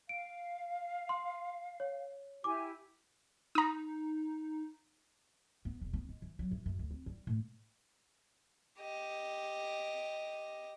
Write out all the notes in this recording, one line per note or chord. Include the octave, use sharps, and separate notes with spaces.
F5 D7
C6
C#5
E4 G4 G#5 D6
D#4 A#5 D#6
B3
E1
B3
G#3
E3
F#3
F#2
F#2
D2
C4
G3
A2
G4 D#5